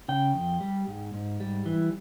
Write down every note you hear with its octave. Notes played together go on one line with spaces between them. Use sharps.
C#3 G5
F2
G3
G#2
G#2
G3
E3